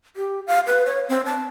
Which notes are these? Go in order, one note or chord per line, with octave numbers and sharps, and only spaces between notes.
G4
F5
B4
C#5
C4
A5